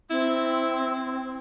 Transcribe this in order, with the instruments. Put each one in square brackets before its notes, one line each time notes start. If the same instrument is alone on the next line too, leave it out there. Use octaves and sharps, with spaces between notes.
[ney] C4 [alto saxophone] E4